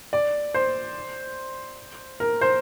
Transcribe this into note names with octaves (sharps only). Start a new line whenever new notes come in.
D5
C5
A#4
C5